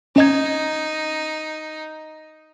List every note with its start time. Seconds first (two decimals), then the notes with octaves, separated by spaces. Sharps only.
0.16 C#4 D#4 D#5 G#6